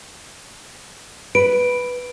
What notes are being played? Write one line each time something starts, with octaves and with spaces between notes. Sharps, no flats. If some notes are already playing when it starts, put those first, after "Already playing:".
B4 D7